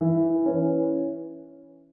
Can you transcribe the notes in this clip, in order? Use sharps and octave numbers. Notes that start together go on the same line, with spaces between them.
E3
C#4 E4 B4